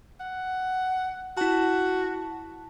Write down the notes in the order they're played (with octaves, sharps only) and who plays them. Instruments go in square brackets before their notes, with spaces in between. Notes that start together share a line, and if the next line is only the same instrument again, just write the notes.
[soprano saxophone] F#5
[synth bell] E4 A5 [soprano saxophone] F#4